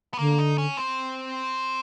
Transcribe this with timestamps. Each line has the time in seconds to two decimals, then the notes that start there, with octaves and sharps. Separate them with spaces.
0.14 B3
0.18 D3 A#3
0.39 D#4
0.58 C#4
0.77 C4